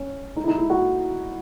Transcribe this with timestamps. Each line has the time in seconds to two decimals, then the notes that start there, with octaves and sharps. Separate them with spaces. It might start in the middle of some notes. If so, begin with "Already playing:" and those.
Already playing: C#4
0.36 D#4
0.43 E4
0.48 D#4
0.58 E4
0.70 F#4